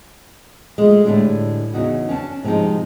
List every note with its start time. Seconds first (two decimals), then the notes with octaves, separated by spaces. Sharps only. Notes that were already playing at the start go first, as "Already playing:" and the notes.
0.78 G#3 A3 F4
1.05 A2 D3 G3 G#3 D4
1.73 E2 C#3 D#4 F#4
2.09 C#4 D4 G5 A5
2.44 G#2 C3 F3 G#3 D#4